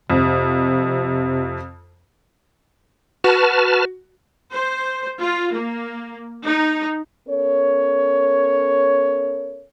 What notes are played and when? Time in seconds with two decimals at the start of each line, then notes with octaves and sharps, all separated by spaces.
0.10 F2 C3
3.24 F#4 B4 A5 F6
4.52 C5
5.20 F4
5.51 A#3
6.46 D#4
7.28 B3 C#4 A4 A#4 C#5